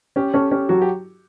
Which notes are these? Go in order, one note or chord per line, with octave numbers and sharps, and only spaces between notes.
C#4 G4
C#4 A4
C#4 G4
F#3 F#4
G4